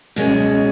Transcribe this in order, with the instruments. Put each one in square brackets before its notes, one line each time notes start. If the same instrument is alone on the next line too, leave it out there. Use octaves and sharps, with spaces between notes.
[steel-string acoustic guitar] B2 G#3 C#4